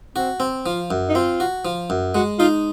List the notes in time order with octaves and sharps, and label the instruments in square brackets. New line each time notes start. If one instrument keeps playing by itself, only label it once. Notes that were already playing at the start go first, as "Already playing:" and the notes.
[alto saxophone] C4 [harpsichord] F#4
[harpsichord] C4
[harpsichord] F3 [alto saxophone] F4
[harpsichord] F#2
[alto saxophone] D#4
[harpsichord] C4 [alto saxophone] F4
[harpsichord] F#4
F3
F#2
[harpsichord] G#3 [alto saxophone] F#4
[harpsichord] D#4 [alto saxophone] F4